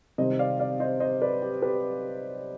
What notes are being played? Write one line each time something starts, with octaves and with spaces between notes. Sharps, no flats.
C3 D#3 G3 C4 C5 D#5
D5 F5
D5 F5
C5 D#5
C5 D#5
B4 D5
G4
G4 B4